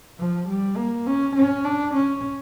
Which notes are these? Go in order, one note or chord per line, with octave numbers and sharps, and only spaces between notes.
F3
G3
A#3
C#4
C#4
D4
C#4